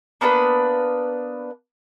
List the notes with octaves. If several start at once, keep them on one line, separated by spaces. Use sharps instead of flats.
A#3 B3 D4 B4